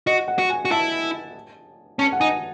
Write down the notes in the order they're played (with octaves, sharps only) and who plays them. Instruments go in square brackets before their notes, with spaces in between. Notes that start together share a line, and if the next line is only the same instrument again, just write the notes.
[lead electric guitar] F#4 [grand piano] D#5
[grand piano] F#5
[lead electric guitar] F#4
[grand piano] G#5
[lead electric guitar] F#4
[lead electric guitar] E4 [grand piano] A5
[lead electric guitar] C#4 [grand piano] A5
[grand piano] F#5
[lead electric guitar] D#4 [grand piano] G#5